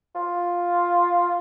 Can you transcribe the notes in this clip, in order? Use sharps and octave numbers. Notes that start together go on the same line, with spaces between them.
F4